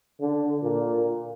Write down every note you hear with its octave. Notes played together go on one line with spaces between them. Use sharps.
D3
A#2